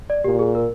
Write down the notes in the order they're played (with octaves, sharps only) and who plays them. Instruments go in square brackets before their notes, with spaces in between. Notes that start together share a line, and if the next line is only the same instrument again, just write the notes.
[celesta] D5
[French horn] A#2 [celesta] G4
[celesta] G#4
A#4